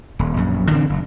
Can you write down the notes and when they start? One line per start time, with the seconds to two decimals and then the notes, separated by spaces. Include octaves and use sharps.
0.19 D#1
0.37 A#1 F#2
0.71 D3 E3 C4
0.89 F#1